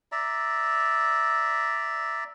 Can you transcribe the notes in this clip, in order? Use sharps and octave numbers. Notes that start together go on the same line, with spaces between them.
D5 E5 A#5